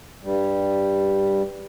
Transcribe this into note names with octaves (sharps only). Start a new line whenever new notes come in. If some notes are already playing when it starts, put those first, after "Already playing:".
G2 G3